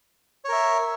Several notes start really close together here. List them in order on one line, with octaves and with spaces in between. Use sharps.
C#5 A#4 E5